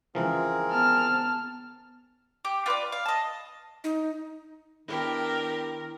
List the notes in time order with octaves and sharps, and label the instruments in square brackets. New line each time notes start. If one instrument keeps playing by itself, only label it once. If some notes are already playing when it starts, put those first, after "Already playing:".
[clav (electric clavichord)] C#2 E3 F3 [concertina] C4 G#4 A#4
[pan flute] B3 [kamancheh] A5 F6
[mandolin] G4
F4 B4 C#5 D5
F5
D#5 A5
[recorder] D#4
[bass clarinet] D#3 [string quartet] B3 D4 G4 [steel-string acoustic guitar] E4 [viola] A#4